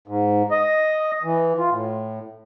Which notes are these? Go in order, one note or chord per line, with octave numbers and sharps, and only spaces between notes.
G#2
D#5
E3
F4
A2